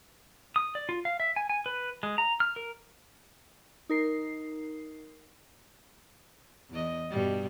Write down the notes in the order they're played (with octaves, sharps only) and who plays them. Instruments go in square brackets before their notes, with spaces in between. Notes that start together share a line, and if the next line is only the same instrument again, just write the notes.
[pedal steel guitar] D#6
D5
F4
F5
E5
G#5
G#5
B4
G#3
A#5
F6
A#4
[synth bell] D#4 A#4 C7
[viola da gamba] E2 D#5
G2 B2 G3